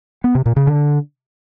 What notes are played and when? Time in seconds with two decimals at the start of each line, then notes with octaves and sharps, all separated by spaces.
0.24 B3
0.35 C3
0.46 A#2
0.56 C#3
0.67 D3